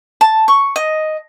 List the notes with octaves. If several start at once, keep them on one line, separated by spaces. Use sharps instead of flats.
A5
C#6
D#5